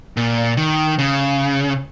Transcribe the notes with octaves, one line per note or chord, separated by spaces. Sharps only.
A#2
D#3
C#3